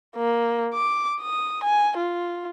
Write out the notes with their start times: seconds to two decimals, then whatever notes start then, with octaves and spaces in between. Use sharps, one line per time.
0.16 A#3
0.74 D6
1.21 D#6
1.64 G#5
1.97 F4